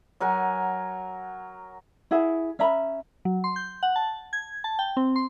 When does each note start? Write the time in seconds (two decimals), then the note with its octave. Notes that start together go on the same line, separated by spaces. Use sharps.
0.20 F#3 A#4 F#5 G#5
2.11 E4 G#4 E5 F#5
2.59 C#4 E5 A#5 B5
3.25 F#3
3.44 C6
3.56 G6
3.83 F#5
3.96 A5
4.33 G#6
4.64 A5
4.79 G5
4.97 C4
5.16 C6